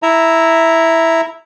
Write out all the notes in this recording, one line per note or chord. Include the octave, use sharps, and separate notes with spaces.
E4 E5 A#5